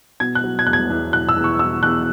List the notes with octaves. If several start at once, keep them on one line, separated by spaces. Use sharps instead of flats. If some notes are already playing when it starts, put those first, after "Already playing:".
B2 G#6
F#6
F#3
G#6
E2 F#6
G#6
E2
B2 F#6
E6
E2
C#6
B2 E6
E2 F#6